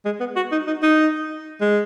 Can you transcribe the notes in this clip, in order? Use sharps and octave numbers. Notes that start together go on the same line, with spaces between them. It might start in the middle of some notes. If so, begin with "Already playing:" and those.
G#3
B3
F#4
D#4
D#4
D#4
G#3